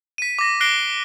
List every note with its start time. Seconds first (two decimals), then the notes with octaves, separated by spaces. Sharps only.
0.18 B6 D#7
0.39 D6 A#6
0.61 F#6 A#6 C7 D7 G7